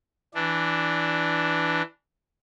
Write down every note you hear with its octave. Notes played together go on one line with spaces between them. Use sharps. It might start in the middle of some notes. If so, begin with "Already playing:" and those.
E3 D4